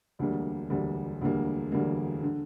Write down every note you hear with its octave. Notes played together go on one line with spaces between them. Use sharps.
E1 D2 D3 G3 A#3
E1 D2 D3 G3 A#3
E1 D2 D3 G3 A#3
E1 D2 D3 G3 A#3
D3